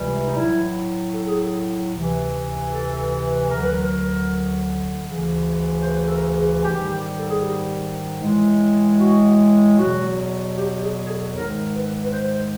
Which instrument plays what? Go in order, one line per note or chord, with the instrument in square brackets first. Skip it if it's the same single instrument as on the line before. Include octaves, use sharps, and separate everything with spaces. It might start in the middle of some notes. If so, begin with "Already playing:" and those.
Already playing: [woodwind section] C#2 C3 E3 G3
D#4
A2 F#3 E4
A4
G#4
A4
D2 C3 E3
A4
D2 D3 F#3 A#4
B4
A#4
D2 C#3 E3
C5
B4
A4
A#4
G#4
G#2 D#3 G3 G4
A4
G#4
G4
A2 E3 G#3
F#4
E2 B2 F#3 F#4
G4
G4
G#4
G#4
A4
G#2 D#3 G#3 A#4
B4
B4
C5